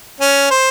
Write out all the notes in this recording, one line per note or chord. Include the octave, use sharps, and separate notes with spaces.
C#4
C5